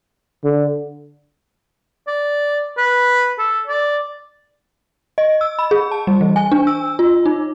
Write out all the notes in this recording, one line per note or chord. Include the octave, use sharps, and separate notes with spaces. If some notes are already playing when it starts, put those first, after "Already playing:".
D3
D5
B4
A4
D5
D#5
E6
B5
G#4
A5
G3
E3
G#5
D4
E6
F4
D#4